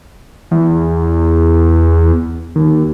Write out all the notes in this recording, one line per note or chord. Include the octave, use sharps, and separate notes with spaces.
E2
D#2